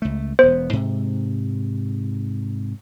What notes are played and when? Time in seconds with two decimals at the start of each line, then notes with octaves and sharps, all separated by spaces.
0.02 C#2 A3
0.39 E1 B3 C5
0.73 G#2 C3